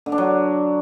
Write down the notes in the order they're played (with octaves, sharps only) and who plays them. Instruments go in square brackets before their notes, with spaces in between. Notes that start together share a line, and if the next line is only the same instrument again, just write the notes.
[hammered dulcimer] D3
D4
F#3